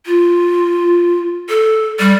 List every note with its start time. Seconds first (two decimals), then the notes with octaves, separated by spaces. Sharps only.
0.06 F4
1.49 A4
1.99 G3